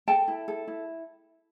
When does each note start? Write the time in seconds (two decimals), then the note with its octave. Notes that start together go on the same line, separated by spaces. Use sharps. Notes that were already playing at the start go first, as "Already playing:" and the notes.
0.08 A4 G5 A5
0.28 E4
0.48 A4
0.68 E4